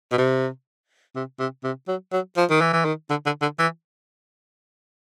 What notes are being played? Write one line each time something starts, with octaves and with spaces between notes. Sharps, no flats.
B2
C3
C3
C3
C3
F#3
F#3
F3
D#3
E3
E3
D#3
D3
D3
D3
E3